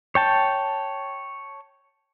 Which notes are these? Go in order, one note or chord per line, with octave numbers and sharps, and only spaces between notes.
C#5 G5 A5